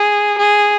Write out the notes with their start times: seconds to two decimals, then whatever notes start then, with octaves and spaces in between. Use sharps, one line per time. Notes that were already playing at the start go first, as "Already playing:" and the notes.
Already playing: G#4
0.38 G#4